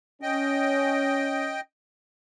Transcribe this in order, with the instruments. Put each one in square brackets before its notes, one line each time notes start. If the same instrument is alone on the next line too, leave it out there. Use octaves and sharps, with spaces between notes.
[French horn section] C#4 [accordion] D#5 G5